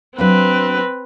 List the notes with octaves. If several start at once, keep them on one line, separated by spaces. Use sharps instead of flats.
F#3 C4 D4 B4 F5